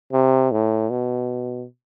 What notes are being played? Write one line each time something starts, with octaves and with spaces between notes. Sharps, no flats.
C3
A2
B2